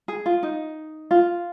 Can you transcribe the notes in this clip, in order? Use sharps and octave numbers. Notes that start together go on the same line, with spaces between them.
G#4
F4
D#4
F4